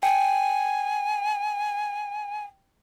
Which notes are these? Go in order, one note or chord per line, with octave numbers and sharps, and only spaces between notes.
G5 G#5